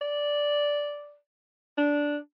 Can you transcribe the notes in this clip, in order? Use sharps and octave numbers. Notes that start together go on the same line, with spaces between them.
D5
D4